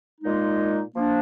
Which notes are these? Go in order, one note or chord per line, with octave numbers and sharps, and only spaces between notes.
A#2 G#3 D#4
F3 A#3 D4